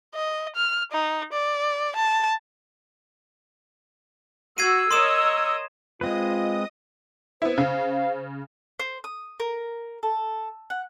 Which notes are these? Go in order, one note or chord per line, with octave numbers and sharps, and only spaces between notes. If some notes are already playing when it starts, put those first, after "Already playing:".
D#5
F6
D#4
D5
A5
F#4 E6 G#6 C7 D#7
A#4 C#5 D#5 C6 D#6 E7
G#3 C4 F4 B4 D#5 D#6
B3 E4 C5
C#3 F5
C5
D#6
A#4
A4
F#5